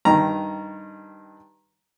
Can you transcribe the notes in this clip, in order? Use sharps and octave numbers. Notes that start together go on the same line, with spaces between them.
G2 D#3 A#5